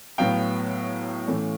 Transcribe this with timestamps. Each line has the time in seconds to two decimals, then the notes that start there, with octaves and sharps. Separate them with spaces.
0.18 A2 F#3 B3 F5 G5
1.28 A2 E3 A3 C#4